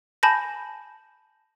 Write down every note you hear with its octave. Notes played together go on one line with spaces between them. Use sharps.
G#5 A5 B5 G6 A#6